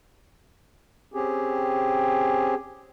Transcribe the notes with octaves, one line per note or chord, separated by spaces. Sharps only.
C4 C#4 G4 G#4